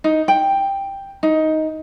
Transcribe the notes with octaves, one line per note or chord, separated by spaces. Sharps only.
D#4
G5
D#4